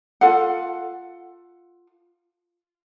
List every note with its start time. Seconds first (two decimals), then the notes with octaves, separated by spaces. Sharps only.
0.21 F4 A4 F5 F#5